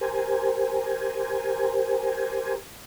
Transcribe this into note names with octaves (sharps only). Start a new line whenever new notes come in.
G4 A#4 C5 G#5